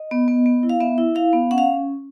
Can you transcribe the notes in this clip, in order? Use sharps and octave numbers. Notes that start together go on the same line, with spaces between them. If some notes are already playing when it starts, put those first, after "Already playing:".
Already playing: D#5
B3
B3
B3
E4
F5
B3 E5
E4
E4 F5
B3
C#4 F#5
F5